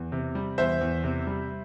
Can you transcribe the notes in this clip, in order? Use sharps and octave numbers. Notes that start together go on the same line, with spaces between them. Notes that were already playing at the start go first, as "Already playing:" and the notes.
Already playing: E2
C3
G3
E2 C5 E5
E2
C3
G3